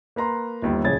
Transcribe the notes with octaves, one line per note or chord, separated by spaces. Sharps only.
A#3 B4 A#5 C6
G1 D#2 G3
D1 A#1 C#3 C#4 G#6 A6